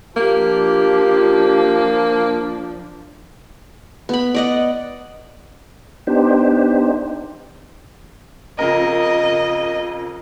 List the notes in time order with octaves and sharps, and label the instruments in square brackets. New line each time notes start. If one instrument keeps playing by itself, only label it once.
[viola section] F3 D4 [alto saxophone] A#3 [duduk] G4
[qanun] B3 B5
D5 D#5 F#5
[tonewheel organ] B3 D4 D#4 G4 C5
[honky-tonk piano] F2 C#3 A#4 [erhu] D#5